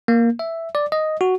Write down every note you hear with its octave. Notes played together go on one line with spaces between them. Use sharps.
A#3
E5
D5
D#5
F#4